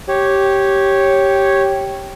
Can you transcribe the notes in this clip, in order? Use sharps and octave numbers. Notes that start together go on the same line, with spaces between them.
G4 C#5